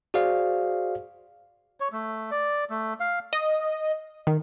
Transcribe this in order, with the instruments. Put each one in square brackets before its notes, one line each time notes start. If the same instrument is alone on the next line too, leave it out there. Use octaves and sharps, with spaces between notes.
[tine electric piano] F#4 G#4 C5 D5 F5
[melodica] C#5
A3
D5
A3
F5
[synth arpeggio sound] D#5
D#3